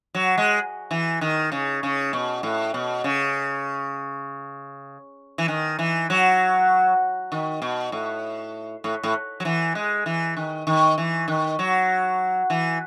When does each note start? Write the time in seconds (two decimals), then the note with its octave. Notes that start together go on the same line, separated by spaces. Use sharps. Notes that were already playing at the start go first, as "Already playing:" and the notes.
0.14 F#3
0.38 G#3
0.91 E3
1.21 D#3
1.52 C#3
1.83 C#3
2.13 B2
2.43 A2
2.74 B2
3.04 C#3
5.38 E3
5.48 D#3
5.79 E3
6.10 F#3
7.32 D#3
7.62 B2
7.92 A2
8.84 A2
9.03 A2
9.40 F#3
9.45 E3
9.75 G#3
10.06 E3
10.37 D#3
10.67 D#3
10.98 E3
11.28 D#3
11.59 F#3
12.50 E3